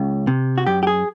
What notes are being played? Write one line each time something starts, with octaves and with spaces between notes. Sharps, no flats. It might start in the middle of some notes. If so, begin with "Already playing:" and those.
Already playing: C#2 C#3
C3
F#4
F#2 G4
G4
G#4